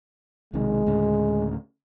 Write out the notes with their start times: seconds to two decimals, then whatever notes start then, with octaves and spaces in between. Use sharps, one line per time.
0.53 B1 C3 D#3 G#3
0.86 D2 A2 C#3